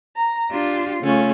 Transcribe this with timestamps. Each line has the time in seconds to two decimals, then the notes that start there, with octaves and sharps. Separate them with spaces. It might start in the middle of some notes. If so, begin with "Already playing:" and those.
0.16 A#5
0.50 D4 F4 G4
1.02 C#3 A3 C#4 F4